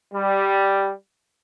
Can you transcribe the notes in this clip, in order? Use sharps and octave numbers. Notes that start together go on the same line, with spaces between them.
G3